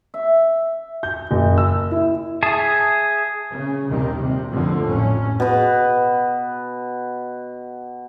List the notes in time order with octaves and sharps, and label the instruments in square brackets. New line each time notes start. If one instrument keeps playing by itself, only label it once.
[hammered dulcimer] E5
[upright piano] G6
F#1
E6
E4
[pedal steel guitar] G#4 E5 A5 D#6
[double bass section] C#3
A#1 D#2 C3 D#3 G3
C3
F2 A2 D3 F3
A1 F2 C#4
[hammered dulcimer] B2 B4